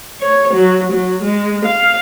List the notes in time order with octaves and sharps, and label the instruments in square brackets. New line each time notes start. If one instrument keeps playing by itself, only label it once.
[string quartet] C#5
F#3
F#3
G#3
F5